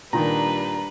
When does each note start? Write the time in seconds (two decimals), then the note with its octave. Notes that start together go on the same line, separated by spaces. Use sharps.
0.13 A#2 D#3 G3 D4 B4 A#5